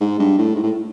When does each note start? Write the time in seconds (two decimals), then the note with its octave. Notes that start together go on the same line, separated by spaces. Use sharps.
0.01 G#2
0.19 G2
0.38 A2
0.56 G#2
0.63 A2